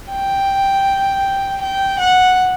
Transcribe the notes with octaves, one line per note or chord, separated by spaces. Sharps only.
G5
G5
F#5